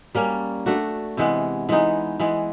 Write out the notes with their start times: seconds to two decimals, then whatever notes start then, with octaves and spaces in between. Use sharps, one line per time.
0.15 G3 A#3 C#4
0.66 A3 D4 F#4
1.17 C3 E3 G#3 B3
1.69 E3 G#3 B3 D#4
2.20 E3 G#3 B3